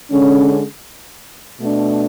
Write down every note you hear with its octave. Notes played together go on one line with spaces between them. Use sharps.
D3 G#3 C#4
B2 A3 D4